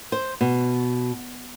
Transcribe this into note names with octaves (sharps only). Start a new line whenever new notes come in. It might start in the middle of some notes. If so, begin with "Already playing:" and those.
C5
B2